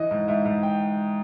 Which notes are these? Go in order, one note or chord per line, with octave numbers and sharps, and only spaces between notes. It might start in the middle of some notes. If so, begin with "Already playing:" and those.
Already playing: E3 D#5
G#2
G#2 E5
G#2
G5